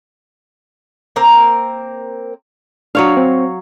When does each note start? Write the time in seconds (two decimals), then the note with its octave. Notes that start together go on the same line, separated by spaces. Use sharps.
1.16 A#3 C4 A#4
2.95 F#3 D4 C#5 F5
3.17 C4